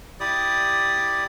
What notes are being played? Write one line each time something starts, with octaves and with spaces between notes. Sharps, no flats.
E4 G4 D5 D#6